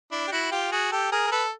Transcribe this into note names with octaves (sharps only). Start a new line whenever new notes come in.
D4 E4
G4
E4 F#4
F4 G4
F#4 G#4
G4 A4
G#4 A#4
A#4
A4 B4